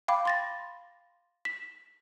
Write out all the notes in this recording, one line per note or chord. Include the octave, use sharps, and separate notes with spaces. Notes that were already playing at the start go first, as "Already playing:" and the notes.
F5 G5 B5 D6
C6 A6 A#6
B6